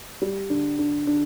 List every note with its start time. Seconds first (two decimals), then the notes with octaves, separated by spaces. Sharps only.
0.22 G3
0.50 D3
0.79 D3
1.07 D3